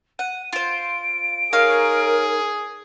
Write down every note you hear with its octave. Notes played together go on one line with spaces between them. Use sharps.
F#5 D#7
F4 C5 D7
D#4 G#4 A#4 C#5 F5